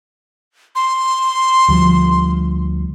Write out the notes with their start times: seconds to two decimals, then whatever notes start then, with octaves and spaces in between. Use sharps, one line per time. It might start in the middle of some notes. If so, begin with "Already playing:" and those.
0.75 C6
1.68 D2 F3 G3